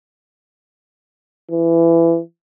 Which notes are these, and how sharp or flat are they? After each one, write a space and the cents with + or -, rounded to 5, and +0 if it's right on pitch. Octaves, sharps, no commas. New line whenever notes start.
E3 +20